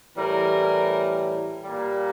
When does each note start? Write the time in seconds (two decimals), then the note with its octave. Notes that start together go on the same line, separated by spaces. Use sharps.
0.17 A2 E3 G3 A#4
1.63 A#2 G3 A#3